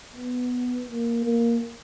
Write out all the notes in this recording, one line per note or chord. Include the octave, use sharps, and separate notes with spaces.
B3
A#3
A#3